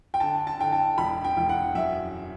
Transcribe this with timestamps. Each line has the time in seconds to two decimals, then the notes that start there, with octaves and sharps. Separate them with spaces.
0.14 G5
0.20 D3 A5
0.47 A5
0.59 D3 G5
0.72 A5
0.98 E1 B5
1.24 G5
1.37 E1
1.49 F#5
1.75 F#2 E5